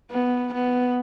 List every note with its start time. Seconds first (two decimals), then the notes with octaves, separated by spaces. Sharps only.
0.11 B3
0.53 B3